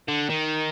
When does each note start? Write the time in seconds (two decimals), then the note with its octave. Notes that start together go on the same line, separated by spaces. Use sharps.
0.08 D3
0.29 D#3